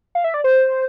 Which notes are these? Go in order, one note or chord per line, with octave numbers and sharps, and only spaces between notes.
F5
E5
D5
C5